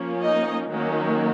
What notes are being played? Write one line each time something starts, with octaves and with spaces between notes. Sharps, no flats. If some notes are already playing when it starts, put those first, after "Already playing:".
Already playing: F3 A#3 C#4
D#4 D#5
D#3 F#3 A#3 C#4